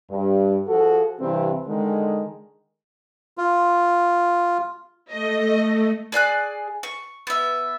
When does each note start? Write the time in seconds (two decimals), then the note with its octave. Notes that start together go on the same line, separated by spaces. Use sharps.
0.10 G2
0.67 F3 F#4 G#4 A4
1.20 G2 C3 E3 C4
1.67 D3 D#3 G#3
3.38 F4
5.10 A3 D#5
6.12 G#4 D5 G#5 F#6
6.83 C#6
7.27 B3 E5